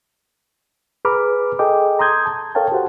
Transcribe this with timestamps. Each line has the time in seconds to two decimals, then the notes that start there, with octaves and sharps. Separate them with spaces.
1.05 G#4 B4 A#5 B5 D6 F6
1.59 G#4 A4 D#5 G5 D6
1.99 A#5 C6 D#6 G6 G#6
2.26 A5
2.55 A4 A#4 C#5 F5 G5 A5
2.72 F#4 G4 C5 F#5